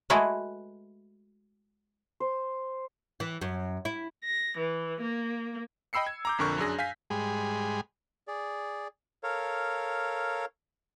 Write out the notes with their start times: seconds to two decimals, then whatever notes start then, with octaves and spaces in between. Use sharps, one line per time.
0.10 G#3 A3 E4 F#4 G#4 B4
2.20 C5
3.20 E3
3.41 F#2
3.85 E4
4.25 A#6
4.58 E3
5.02 A#3
5.93 D#5 G5 B5 E6 C7 C#7
6.07 G#6
6.25 A#5 D6 G6
6.38 A#1 F2 D3 A#4 C#6 F#6
6.58 F#2 D4 G#4 A#6
6.79 F5 G#5 G6 B6
7.10 G#2 G3 G#3 G#4 B5 C6
8.28 G#4 D5
9.23 A4 A#4 C#5 F5